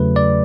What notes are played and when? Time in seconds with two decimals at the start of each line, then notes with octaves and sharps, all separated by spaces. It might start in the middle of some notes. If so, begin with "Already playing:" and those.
Already playing: E2 C#3 F#3 A3 B4
0.16 D5